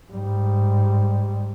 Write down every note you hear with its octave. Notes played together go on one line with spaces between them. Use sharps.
G#2 G3